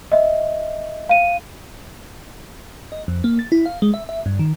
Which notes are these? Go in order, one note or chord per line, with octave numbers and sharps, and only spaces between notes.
D#5 E5
F5 D#7
D#5
F2
A#3
A6
E4
F5
G#3
E5
E5
G2
D#3